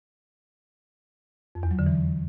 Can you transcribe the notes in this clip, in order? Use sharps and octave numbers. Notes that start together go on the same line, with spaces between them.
F2
E2
F#3
D3
E3